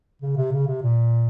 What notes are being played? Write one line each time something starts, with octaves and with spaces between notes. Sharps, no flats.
C#3
C3
C#3
C3
A#2